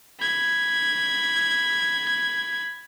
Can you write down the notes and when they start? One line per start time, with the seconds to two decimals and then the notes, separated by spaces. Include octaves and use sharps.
0.20 B5 G#6